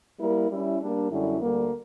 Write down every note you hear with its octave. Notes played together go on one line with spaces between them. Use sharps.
G3 A#3 E4 A#4
G3 C#4 E4
G3 A#3 D4
F#2 D3 G3 C#4 E4
D2 D3 G3 A#3